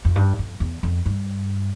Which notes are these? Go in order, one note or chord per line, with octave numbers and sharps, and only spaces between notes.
F2
G2
F2
E2
F2
G2